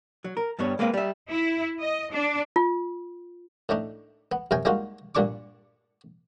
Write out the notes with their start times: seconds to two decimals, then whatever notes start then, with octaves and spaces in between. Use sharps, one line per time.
0.24 F#3
0.37 A#4
0.59 G2 G3 B3 C#5
0.79 G#3 A#3 C4 B4 F5
0.94 G3 E5
1.29 E4
1.79 D#5
2.11 D4
2.56 F4
3.69 A2 A3 D4 D#4
4.32 B3
4.51 F#2 C3 A#4 G5 G#5
4.65 G3 G#3 A#3 D#4 F4 F#4
5.15 G2 A#2 G3 D4 C#6 D6